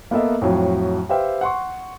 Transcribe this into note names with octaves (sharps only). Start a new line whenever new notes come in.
A#3 B3 A4 D#5 E5
F2 A2 F#3
G4 B4 C5 E5 F5 G5
F#5 C6 C#6